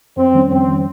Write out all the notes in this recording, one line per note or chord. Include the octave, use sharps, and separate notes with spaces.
F2 C4
D#3 G3 C#4
F2 C4
D#3 G3 C#4